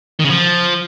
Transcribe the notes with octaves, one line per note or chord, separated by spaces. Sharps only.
D#3
C#3
F3